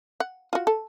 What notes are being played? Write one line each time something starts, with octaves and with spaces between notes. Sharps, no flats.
F#5
F4 F#4
A4